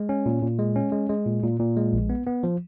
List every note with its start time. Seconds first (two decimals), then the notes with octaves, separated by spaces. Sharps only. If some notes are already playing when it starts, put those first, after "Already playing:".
Already playing: G#3
0.09 C#4
0.26 A#2
0.42 A#2
0.59 G#3
0.76 C#4
0.92 G#3
1.09 G#3
1.26 A#2
1.43 A#2
1.60 A#2
1.77 G#3
1.93 A#1
2.10 B3
2.27 B3
2.43 F3